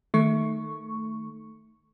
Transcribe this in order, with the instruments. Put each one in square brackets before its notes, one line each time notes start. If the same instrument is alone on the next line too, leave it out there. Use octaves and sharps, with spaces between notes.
[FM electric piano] D#3 A3 C#6